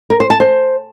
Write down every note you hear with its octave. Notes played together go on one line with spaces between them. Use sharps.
A#4
C5
A5
C5